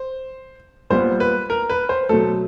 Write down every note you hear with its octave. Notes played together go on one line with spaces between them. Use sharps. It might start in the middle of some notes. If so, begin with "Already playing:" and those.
Already playing: C5
A#2 G3 B3 C5
B4
A#4
B4
C5
B2 F#3 A3 A4